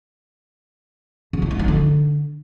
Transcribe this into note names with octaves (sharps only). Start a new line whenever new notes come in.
C#3
E4
G#3
D#4
D3